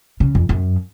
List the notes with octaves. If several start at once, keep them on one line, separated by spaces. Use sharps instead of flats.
C#3
F2
F#2